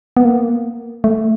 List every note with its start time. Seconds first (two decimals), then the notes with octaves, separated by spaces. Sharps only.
0.17 B3
0.25 A#3
1.04 A3